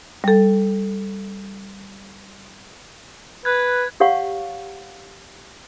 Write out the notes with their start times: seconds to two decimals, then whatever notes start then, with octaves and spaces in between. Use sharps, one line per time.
0.24 G3 A4
3.45 B4 F#6 G#6
4.00 G4 C#5 F5 F#5 C#6